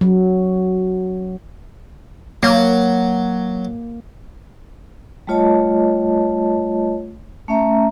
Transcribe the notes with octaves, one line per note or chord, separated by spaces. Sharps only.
F#3
F#3 A#3
G3 A3 F4 C#5 D#5 A5
A3 C#4 E5 A#5